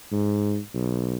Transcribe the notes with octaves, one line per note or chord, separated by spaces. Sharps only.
G#2
B1